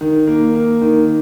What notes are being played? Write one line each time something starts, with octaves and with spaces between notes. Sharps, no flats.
D#3
A#3
A#3
D#3